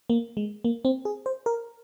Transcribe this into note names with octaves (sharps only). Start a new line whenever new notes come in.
A#3
G#3
A#3
C4
G#4
C5
A#4